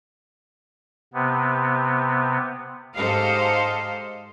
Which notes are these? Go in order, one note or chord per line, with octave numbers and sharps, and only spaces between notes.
C3 B3
G#2 G4 A4 C5 D#5 F5